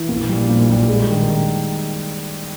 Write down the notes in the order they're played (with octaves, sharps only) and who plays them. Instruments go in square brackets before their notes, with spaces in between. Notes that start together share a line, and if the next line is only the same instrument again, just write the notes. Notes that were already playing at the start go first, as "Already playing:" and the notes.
Already playing: [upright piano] E3
[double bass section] A#1 A#2 [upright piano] A#3
[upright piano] G3
A#3
G3
G#3
D#3
D#3